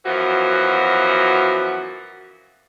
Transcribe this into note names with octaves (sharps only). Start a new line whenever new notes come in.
F#2 E3 F3 B3 F#4